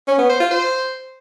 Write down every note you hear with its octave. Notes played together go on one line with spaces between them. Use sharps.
C#4
B3
C5
F4
C5